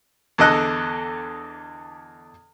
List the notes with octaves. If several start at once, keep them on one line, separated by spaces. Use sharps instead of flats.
E2 D3 A4 D#5 F#6